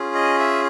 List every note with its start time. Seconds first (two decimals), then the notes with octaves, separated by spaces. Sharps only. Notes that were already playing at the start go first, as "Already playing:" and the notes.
Already playing: C#4 F4 G#4
0.15 D#5
0.40 E5